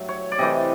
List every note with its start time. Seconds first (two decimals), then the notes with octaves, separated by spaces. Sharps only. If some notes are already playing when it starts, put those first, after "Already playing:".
Already playing: G2 F#3 A3
0.09 C#5
0.32 D5
0.39 C3 E3 A3 D#5